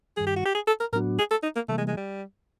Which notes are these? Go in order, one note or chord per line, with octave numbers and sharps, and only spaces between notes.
G2 D#3 G3 G#4
G4
F#4
G4
G#4
A4
A#4
A2 F#3 B3 D4 F#4 A#4
G#4
A4
D#4
A#3
C3 E3 G3 A3 A#3
G#3
G#3
G3